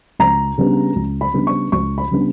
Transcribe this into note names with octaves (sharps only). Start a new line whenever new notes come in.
C#2 A#5
C#3 G3 B3 D4
C#2
B5
C#3 G3 B3 D4
C#6
C#2 C#6
B5
C#3 G3 B3 D4